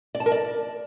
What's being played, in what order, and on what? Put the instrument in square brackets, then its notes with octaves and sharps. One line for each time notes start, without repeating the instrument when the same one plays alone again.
[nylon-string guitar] D5
A5
A#4
D5